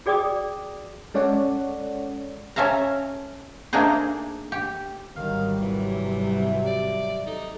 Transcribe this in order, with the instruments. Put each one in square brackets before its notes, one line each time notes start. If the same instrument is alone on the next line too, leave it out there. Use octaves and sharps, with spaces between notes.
[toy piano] F#4 G#4 D5 G5 D6 D#6
[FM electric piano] G#3 C#4 A4 C#5 D5 F#5
[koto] C#4 A4 E5 F5 A#5
A3 A#3 D4 D#4 G#4 C5
G4
[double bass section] G#1 F#3 G3 [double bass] D#3 [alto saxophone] F5
[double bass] C3 [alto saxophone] E3
[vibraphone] G4 E5
[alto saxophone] D5
[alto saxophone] D#4 [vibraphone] A4